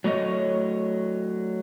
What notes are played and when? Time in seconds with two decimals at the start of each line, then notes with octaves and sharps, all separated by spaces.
0.04 F#3 A3 C#5 D#5